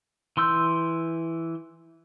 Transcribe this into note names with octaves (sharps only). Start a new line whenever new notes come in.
E3 C6 E6 G6